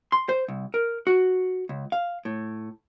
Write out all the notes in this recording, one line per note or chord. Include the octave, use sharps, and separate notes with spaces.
C6
C5
C2
A#4
F#4
C#2
F5
A2